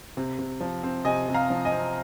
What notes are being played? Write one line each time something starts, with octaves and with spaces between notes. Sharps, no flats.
C3
C3
F3
C4
C3 D#5 G#5
C3
F5 A#5
F3
D#5 G#5
C4